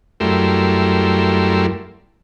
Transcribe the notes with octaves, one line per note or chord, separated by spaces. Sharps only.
F#2 G3 A3 E4 A#4 C6